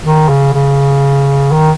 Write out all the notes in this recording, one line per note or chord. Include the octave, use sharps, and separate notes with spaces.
D#3
C#3
C#3
D#3